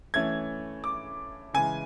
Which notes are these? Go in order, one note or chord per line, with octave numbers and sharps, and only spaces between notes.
E3 A3 C#4 G#6
D6
C#3 E3 G#3 G#5